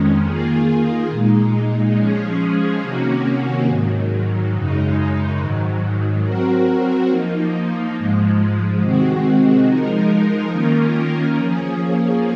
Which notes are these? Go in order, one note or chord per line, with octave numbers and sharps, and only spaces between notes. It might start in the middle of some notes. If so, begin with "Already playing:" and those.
Already playing: F2 D#3 G#3 C#4
D#3 A#3 F4 G#4
A#2 G#3 D#4
F3 G#3 C#4 G#4
C3 D#3 A#3 C#4 F#4
G#2 D#3 F#3
F#2 C#3 G#3 D#4
G#2 D#3 F#3
F#3 C4 F#4 A#4
F3 A#3 D#4
G#2 F3 G#3
C3 D#3 G#3 C4 F#4
F3 G#3 D#4 A#4
D#3 A#3 C#4 F4 A#4
F3 A#3 C#4 G#4